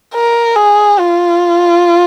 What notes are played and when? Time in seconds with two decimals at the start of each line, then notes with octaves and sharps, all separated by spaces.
0.15 A#4
0.56 G#4
0.99 F4